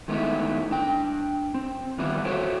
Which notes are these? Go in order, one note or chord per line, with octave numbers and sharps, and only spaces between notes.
D#3 G#3 A3 B3 D#4 E4
D4 G5
C4
D#3 E3 G3 B3 E4 F4
F#4 A4 C5 C#5 E5 G5